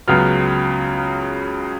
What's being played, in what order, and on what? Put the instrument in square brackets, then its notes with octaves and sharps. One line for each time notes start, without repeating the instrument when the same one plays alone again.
[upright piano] C#2 C#3 F#3 B3 F6